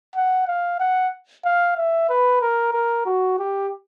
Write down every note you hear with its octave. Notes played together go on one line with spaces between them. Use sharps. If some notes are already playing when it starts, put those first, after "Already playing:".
F#5
F5
F#5
F5
E5
B4
A#4
A#4
F#4
G4